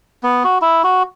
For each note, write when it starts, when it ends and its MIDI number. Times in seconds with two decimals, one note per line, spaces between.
0.23 0.43 59
0.44 0.58 66
0.62 0.82 64
0.84 1.03 66